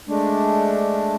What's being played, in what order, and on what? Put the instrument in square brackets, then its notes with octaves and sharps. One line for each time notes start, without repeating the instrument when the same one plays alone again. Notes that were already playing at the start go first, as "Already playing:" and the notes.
[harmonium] G#3 A3 D4